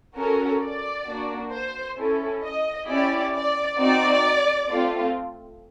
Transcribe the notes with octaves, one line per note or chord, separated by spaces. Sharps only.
C#4 F#4 A4 A#4
D5
A#3 D4 F#4
C5
C#4 E4 A4
D#5
C#4 E4 G4 D5
D5
C4 D#4 F#4 D5
A3 C4 F4